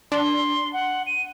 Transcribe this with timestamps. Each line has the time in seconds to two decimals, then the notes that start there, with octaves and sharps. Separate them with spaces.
0.12 D4 C6
0.73 F#5
1.07 D#7